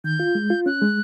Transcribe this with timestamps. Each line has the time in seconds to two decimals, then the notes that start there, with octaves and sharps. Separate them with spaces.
0.04 D#3 G6
0.20 F4
0.35 G#3
0.50 F4
0.66 C#4 F#6
0.82 G#3